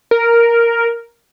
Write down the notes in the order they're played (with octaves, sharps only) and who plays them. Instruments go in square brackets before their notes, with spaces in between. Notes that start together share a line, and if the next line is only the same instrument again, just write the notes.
[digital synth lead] A#4